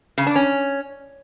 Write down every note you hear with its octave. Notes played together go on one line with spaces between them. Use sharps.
C#3
D4
C#4